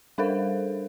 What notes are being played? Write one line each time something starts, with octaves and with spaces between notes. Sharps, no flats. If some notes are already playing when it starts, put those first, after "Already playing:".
G3 D4 A4 A#4 C5 F5